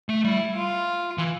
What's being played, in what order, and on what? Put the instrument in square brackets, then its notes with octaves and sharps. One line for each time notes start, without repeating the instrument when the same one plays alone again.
[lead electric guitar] A3
[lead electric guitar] G3 [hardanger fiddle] E4
[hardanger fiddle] F4
[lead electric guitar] E3